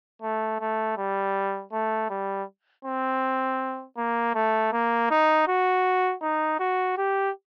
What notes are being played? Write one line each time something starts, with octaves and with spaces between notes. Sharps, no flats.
A3
A3
G3
A3
G3
C4
A#3
A3
A#3
D#4
F#4
D#4
F#4
G4